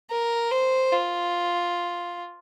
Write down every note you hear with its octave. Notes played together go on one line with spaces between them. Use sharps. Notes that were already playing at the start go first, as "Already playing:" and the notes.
A#4
C5
F4